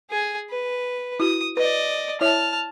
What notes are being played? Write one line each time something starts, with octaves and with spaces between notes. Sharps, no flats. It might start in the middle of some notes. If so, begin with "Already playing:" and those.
G#4 G#5
B4
E4 F#4 D#6
B4 D5 D#5
E4 C#5 E5 A5 F6